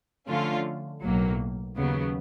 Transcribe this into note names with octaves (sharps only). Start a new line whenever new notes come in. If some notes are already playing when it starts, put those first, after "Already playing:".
D3 F3 A3 C#4 F4
B1 A2 F#3 A#3
D#2 C#3 F#3 B3